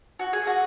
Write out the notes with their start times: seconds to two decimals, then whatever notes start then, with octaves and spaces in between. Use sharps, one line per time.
0.19 F#4
0.33 G#4
0.47 F#4